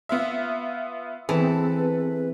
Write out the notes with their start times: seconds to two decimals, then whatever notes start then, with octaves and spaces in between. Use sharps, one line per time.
0.09 B3 F4 E5
1.29 E3 B3 C4 G#4 A4 B4